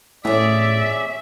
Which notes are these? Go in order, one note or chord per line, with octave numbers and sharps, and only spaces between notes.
A2 C#4 G#4 D5 E5